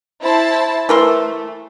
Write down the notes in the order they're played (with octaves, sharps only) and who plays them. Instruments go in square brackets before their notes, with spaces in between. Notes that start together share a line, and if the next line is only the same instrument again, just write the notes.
[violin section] E4 C5 A5
[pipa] E3 A#4 C6 [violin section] A3